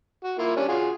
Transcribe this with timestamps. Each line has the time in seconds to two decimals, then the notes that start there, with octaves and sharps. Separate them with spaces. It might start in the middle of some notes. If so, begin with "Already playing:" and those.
0.24 F#4
0.38 A#3 E4 F4
0.56 G3 C#4 D4
0.68 F4 F#4 G#4